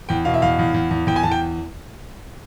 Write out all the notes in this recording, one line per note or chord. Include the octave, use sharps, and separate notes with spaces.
E2 G5
B2 F5
E5
E2 F5
E2
E2
E2
E2 G5
G#5
E2 A5
G5